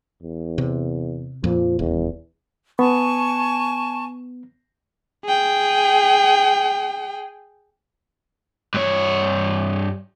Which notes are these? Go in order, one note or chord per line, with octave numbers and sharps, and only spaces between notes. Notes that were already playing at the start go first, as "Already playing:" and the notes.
E2
C3
F2 A#2 F3
D#1 E2
B3 G#5 A5 C#6
G#4 G5
G2 C#5